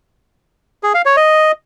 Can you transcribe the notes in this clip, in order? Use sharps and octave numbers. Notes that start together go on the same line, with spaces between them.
G#4
F5
C#5
D#5